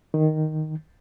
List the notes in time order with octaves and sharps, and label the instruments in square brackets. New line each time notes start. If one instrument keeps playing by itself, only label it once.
[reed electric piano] D#3